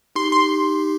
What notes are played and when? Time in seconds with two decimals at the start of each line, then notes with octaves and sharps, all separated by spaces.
0.16 D#4 G4 C6
0.32 C6